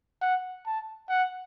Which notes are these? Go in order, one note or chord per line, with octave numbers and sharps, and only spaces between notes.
F#5
A5
F#5